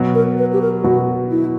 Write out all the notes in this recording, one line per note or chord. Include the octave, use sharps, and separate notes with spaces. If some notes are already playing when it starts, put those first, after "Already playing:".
Already playing: B2 F#3 B3
A#4
B4
G4
A#4
B2 F#3 B3 F#4
E4